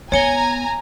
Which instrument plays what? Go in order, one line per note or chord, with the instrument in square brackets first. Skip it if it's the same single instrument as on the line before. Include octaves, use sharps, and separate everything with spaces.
[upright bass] B3 [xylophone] C#5 C#7 G7 [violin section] G#5 A#5